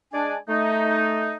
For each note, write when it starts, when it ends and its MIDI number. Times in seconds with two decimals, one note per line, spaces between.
0.13 0.35 56
0.13 0.35 62
0.13 0.35 74
0.13 0.35 80
0.49 1.36 57
0.49 1.36 63